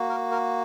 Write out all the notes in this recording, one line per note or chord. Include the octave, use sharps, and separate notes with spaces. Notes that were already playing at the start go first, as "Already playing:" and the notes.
Already playing: A#3 F#4
A#4
A#4